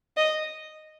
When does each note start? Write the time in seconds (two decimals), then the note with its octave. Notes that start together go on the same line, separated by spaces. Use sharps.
0.17 D#5